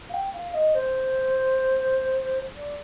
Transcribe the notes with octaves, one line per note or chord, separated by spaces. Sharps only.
F5
G5
F5
D#5
C5
D5